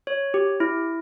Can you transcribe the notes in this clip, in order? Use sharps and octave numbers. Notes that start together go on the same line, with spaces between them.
C#5
G4
E4